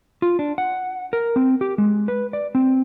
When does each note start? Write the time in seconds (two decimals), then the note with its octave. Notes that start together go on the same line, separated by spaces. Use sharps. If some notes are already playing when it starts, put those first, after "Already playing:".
0.22 F4
0.39 D4
0.58 F#5
1.13 A#4
1.36 C4
1.61 G4
1.78 G#3
2.08 B4
2.33 D5
2.55 C4